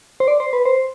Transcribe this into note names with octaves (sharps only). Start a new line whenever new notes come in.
C5
D5
C5
B4
C5